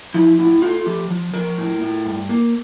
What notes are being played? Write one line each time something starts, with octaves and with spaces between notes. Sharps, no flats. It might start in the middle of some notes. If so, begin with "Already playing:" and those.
F3 E4
A2 E4
A3 F4
F3 G4
F3
F3 A#4
A2
A2
G2
A#3